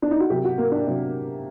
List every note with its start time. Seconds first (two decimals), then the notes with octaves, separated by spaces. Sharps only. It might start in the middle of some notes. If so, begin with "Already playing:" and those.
0.02 D4
0.11 D#4
0.20 F#4
0.30 C3 F#3 G4
0.44 F#4
0.58 A#3
0.72 D4
0.86 C3 F#3